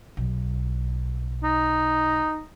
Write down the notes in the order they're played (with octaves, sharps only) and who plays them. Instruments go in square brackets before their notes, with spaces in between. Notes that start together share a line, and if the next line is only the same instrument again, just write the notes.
[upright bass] B1
[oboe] D#4